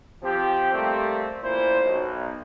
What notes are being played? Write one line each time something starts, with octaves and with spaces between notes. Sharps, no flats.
F3 C4 G4
G3 A3 A#3 C4 G4
A1 A#2 E4 C5
B1